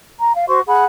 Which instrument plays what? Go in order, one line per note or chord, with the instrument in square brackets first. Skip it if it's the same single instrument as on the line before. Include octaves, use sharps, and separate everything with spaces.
[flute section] A#5
F5
F#4 C5 C6 C#6
G#4 F#5 B5